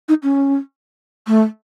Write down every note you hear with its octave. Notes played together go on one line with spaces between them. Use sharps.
D#4
C#4
A3